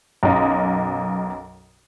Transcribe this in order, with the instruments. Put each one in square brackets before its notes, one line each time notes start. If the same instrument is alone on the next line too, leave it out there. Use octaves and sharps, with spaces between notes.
[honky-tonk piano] B1 F#2 D#5 F5